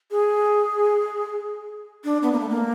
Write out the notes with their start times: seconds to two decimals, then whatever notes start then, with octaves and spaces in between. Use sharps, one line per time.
0.11 G#4
2.04 D4
2.23 B3
2.32 A#3
2.40 A3
2.50 A#3